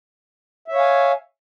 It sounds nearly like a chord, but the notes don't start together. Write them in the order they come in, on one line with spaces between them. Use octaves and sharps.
E5 C#5 F5 G#5